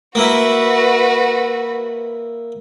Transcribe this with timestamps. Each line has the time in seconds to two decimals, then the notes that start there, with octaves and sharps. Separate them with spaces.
0.15 A#3 E4 F#4 B4